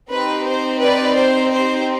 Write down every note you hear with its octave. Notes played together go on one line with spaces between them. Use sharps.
C4 D#4 G4 B4
C5
B4 D5
C5
C5